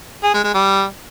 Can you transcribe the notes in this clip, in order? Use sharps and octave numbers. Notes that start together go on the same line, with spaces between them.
G#4
G#3
G#3
G3